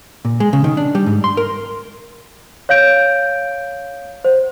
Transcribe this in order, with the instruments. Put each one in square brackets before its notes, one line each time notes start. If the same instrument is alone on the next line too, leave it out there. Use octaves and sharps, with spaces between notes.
[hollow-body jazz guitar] A#2
G#3
C#3
D#3
D4
G3
G#2
C6
A#4
[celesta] C#5 F5 G6 D7
C5